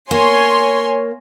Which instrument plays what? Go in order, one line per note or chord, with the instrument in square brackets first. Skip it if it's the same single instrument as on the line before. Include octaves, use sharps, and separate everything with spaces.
[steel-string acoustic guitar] A#3 [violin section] C#5 G#5 C6